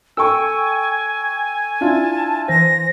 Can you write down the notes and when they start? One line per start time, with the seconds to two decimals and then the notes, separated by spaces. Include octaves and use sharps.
0.17 A4 G5 G#5 C#6 E6
1.81 D4 E4 F4 A5
2.48 E3 C5 A#6